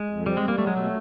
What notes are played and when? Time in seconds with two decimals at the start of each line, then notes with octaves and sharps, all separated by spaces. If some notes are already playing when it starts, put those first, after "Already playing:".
Already playing: G#3
0.10 F2
0.26 G3 C4
0.37 G#3
0.43 G3 A#3
0.58 F#3 A3
0.67 G#3
0.76 B2 A3